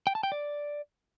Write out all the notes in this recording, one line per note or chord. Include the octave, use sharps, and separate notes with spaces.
G5
A5
G5
D5